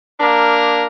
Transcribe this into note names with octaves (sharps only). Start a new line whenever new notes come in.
A#3 D4 A#4